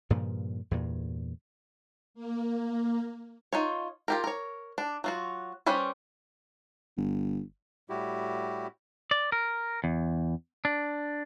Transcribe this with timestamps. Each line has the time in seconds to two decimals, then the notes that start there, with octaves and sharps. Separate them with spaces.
0.10 G2 A#2 C#3 F3
0.71 E2 G2 A#2
2.14 A#3
3.53 D#4 F4 C#5
4.08 F4 G4 A#4
4.24 A#4 C#5
4.78 D4
5.04 F#3 F4 F#4
5.66 G3 C#4 B4 C5
6.98 G1
7.89 A2 G3 E4 F#4 G4
9.11 D5
9.32 A#4
9.84 E2
10.65 D4